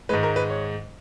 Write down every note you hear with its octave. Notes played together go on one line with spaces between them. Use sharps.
G#2 D#3 G#3 B4
A#4
B4
C#5